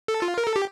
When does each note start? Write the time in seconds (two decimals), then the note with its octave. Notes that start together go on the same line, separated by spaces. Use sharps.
0.08 A4
0.22 F4
0.38 A#4
0.47 A4
0.56 G4